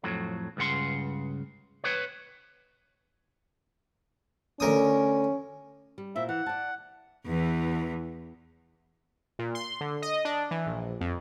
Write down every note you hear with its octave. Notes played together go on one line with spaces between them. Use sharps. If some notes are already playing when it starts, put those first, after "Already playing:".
F2 A2 F#3
C#2 G2 C#3 F#5 C6
B4 C#5
D2 C#4 A#4 D#6
G3
A#2 E4 C5 E5
E3 F#5
D5 A5
E2 E3
A#2
C6
D3
D#5
D4
E3
A#1
F2